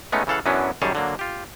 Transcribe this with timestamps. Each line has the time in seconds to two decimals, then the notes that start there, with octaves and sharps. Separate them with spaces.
0.12 G#3 A3 B3 C#4 D#4
0.27 C#3 E3 A4 F5 F#5
0.46 F#2 E3 F#3 B3 C#4 D4
0.82 F#2 D#3 G3 G#4 C#5 A5
0.95 D3 F#3 A#3
1.19 F4 G4